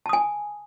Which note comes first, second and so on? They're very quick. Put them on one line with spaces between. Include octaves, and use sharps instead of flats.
A5 D#6 G#5